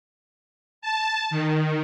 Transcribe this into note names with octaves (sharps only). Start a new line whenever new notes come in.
A5
D#3